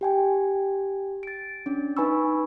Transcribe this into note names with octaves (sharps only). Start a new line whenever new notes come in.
G4 G5 G#5
A6 D7
C#4 D4
D#4 B4 G#5 B5 C#6 E6